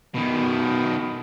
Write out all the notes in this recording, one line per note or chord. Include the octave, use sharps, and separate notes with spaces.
B2 D#3